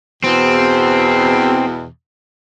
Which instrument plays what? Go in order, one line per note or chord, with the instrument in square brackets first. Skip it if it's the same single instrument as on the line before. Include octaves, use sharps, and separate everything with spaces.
[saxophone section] E2 B2 [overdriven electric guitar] C4